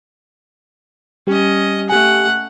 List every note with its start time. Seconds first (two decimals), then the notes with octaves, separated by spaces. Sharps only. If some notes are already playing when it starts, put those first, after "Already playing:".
1.27 G3 C#4 G4 D#5
1.89 A3 G4 F#5 G#5